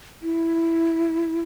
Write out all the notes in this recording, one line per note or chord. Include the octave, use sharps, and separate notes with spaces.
E4